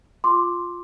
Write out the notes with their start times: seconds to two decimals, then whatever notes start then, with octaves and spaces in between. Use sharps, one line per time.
0.24 F4 C6 D6